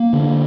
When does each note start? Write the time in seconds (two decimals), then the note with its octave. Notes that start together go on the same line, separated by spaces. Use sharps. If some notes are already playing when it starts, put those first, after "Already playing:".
Already playing: A#3
0.13 D3